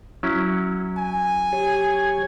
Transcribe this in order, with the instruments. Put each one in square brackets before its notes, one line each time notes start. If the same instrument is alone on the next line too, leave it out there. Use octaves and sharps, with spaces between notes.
[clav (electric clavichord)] F#3 C#4 E4
[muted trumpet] G#5
[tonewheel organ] G4 C#5 G#6